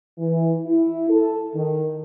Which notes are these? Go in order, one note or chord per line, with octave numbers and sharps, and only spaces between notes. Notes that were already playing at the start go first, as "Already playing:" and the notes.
E3
E4
A4
D#3